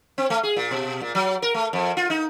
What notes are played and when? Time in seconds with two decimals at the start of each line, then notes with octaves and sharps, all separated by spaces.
0.18 C4
0.30 A3
0.43 G#4
0.56 A#2
0.71 B2
1.01 A#2
1.15 F#3
1.42 A#4
1.54 A3
1.73 F2
1.97 F4
2.10 D#4